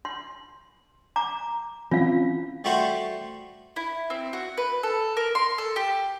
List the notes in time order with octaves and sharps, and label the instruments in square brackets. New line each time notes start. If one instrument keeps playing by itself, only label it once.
[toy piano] C6
A#5 D6
[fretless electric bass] E3 C4 C#4 [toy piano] F4 F5
[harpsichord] G3 A3 F#4 C5
[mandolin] E4
C4
F#4
B4
A4
A#4
C6
A4
G4